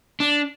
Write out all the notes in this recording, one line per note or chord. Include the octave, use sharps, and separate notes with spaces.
D4